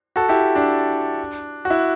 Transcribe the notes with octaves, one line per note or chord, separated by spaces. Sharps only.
F#4 A4
E4 G4
D4
F#4
E4